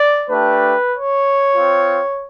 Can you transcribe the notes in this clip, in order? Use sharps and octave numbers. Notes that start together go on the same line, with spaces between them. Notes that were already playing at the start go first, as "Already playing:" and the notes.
Already playing: D5
A3 D4 G4 B4
C#5
C4 F4